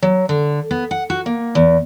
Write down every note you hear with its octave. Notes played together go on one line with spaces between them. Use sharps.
F#3
D3
B3
F#5
F#4
A#3
E2